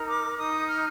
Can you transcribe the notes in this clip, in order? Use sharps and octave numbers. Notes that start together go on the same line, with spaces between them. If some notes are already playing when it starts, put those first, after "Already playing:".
Already playing: D#4 A#4
D6
D#4 D#6
F6